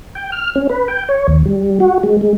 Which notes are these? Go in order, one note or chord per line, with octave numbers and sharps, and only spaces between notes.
G5
F6
C#4
B4
G5
C#5
D#2
G3
F#4
G#3
G#3